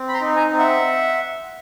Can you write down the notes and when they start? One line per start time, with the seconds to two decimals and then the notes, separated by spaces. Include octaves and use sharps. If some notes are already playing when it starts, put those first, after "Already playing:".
Already playing: C4
0.09 B5
0.13 A#5 C6
0.21 D#4
0.36 G#5 A#5
0.51 C4
0.58 E5 F#5